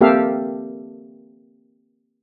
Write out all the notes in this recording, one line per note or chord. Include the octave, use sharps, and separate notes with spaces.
A#3 C4 G4 A4 E5 F5